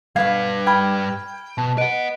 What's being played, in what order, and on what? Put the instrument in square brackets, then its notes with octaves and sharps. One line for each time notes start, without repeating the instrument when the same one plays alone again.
[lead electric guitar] G2 B4 [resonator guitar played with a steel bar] B2 F5 [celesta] G#6
[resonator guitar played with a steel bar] G5 [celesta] B5 F6 G#6
[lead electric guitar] B2 [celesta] A5
[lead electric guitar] B4 F#5 [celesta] D#5 D7